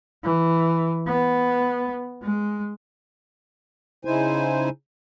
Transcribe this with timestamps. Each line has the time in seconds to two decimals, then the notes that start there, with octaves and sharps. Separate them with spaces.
0.23 E3
1.07 B3
2.22 G#3
4.05 C#3 D#4 E4 C5 G#5